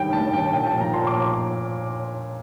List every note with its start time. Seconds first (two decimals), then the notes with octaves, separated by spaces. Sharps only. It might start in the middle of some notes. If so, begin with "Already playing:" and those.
Already playing: G2 D#3 G5
0.13 G2 A5
0.33 D#3 G5
0.53 A#2 G5
0.67 A5
0.73 F3
0.80 A#5
0.94 A#2 C6
1.07 D6